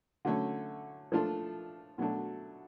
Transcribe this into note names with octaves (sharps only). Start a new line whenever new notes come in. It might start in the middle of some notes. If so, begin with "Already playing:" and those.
D3 F#3 A3 C#4
F3 A3 D4 F4 A4
B2 F#3 A3 D4